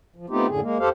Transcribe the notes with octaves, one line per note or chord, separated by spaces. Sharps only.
F3
A3 B3 C4 D#4 F4 G4
F#2 A2 D3 G#4
G#3 A#3
F2 G4 A4 C5 F5